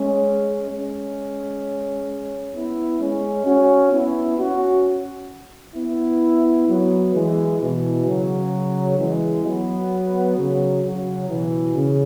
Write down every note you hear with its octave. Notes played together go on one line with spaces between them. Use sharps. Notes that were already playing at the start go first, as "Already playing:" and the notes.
Already playing: G#3 C#4
G#3 C#4
B3 E4
G#3 C#4
C#4 F#4
B3 E4
C#4 F#4
B3 E4
F#3 B3
E3 G#3
B2 E3
C#3 F#3
E3 G#3
F#3 B3
C#3 F#3
C#3 F#3
B2 E3
C#3